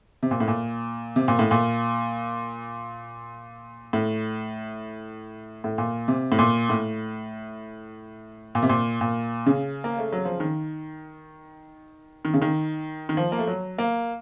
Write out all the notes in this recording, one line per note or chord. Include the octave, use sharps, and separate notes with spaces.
C3
A#2
A2
A#2
C3
A#2
A2
A#2
A2
A2
A#2
C3
A2
A#2
A2
A#2
C3
A#2
A#2
C#3
A#3
A3
F#3
F3
D#3
D#3
C#3
D#3
D#3
F3
A#3
A3
F#3
A#3